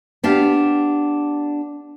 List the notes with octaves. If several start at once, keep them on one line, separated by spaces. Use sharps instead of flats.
B3 D4 G4 F5